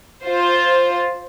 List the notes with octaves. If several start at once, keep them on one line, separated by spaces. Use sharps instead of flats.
F4 C5